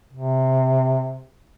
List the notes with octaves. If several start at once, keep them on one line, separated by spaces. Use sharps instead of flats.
C3